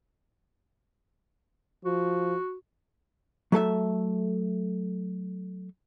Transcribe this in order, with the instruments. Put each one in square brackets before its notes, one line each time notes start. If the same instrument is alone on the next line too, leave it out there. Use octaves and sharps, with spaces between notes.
[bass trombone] F3 [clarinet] F#4
[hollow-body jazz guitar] F#3 A3 A4 E5